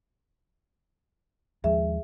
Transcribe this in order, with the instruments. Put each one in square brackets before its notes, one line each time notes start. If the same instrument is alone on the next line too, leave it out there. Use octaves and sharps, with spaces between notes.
[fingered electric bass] D#2 F3 G#3 [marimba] G#4 E5